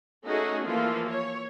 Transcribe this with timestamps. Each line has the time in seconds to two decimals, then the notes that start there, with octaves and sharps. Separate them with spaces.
0.25 A3 C#4 D#4 F#4 G#4
0.66 E3 F3 A#3 F4
1.09 C#5